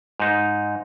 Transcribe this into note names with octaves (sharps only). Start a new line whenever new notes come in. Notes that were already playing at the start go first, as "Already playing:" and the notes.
G#2 D#4